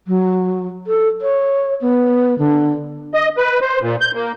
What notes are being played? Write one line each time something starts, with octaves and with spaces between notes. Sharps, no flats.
F#3
A4
C#5
B3
D3
D#5
B4
C5
A#2
G6
A#3